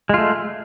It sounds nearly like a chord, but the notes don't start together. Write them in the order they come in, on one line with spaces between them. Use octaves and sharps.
G#3 F4 A3